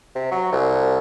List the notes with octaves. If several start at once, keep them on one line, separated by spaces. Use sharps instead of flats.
C3
F#3
C2